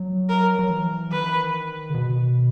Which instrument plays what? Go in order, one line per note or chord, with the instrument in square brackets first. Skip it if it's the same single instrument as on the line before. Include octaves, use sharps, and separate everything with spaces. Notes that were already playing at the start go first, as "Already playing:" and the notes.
Already playing: [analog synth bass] F#3
[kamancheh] A#4
[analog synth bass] F#3
E3
[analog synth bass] D#3 [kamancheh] B4
[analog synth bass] C#3
B2